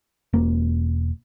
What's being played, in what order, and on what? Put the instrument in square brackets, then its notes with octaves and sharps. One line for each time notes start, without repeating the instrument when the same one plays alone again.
[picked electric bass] E1 A#3